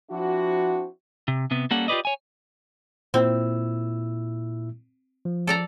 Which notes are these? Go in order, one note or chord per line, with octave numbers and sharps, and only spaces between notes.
F3 C4 D4 E4 F#4
C3
C3 B3
G3 A#3 C#4 A4 F#5
F4 G4 G#4 B4 D5 D#5
C#5 G#5
A#2 C4 E4 E6
F3
A4 D5 A#5